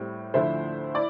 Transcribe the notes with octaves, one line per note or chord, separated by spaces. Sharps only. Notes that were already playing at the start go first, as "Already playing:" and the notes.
Already playing: A2 G3 C4
D2 D3 F3 A3 E4 C5 E5
E4 D5